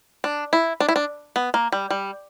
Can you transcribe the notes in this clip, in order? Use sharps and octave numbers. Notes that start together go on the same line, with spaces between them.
D4
E4
D4
E4
D4
B3
A#3
G3
G3